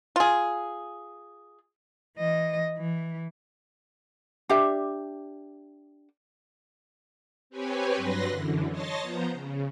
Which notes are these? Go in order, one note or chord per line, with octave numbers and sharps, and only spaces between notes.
F4 G#4
E3 D#5
E3
D4 G4 E5
C4 G4 B4 C#5 G#5
G2 F#3 B4 C6 A#6
F#2 D3 E3
C#5 D#5 A5 C6 A6 A#6
F3 B3 C5 A#5
C#3